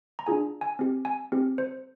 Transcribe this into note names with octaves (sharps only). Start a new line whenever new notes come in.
A#5
D4 F4 G#4 G#5
G#5
C4 G4
G#5
C4 G4
C5